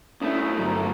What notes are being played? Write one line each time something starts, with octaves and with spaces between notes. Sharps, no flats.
B1 A3 C#4 D4 E4 B4 D#6
G1 G2 F#3 C4 A#5